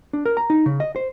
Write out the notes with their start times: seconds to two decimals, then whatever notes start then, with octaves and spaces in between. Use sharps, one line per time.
0.13 D4
0.25 A#4
0.37 A#5
0.50 D#4
0.66 C#3
0.80 D#5
0.96 C5